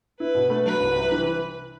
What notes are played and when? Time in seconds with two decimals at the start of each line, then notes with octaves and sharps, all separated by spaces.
0.19 E4 B4
0.35 B2
0.50 A3
0.66 F#3 B4
0.80 C2
0.96 C3
1.12 E3